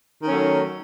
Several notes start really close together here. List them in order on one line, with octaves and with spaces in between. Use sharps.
D#3 C#4 F#3 A3